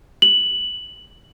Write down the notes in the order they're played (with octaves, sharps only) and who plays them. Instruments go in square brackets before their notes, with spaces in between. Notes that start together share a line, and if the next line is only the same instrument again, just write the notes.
[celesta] F#7